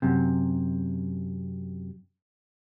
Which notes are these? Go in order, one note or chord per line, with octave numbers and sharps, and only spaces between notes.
F#2 C3